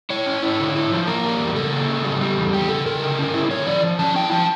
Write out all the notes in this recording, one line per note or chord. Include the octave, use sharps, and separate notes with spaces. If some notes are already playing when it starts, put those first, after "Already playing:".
E4 C#5
C#4
E4
D3
E4
F3
A#3 A#4
G3
E2
C#3 A4
A#3
C#3
G3
G3
E2
E2 G4
C#3 A4
C#3 A#4
D3
C#4
E4
D3 C#5
F3 D5
F3
C#4 A5
E4 G5
F3 A5